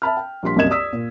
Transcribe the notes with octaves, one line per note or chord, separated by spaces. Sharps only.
E5 A5 B5 F6
G5
A#1 G3 C6 B6
C2 F#2 A#3 D#5 G#6 E7
D5 D#6 E6 B6
A#2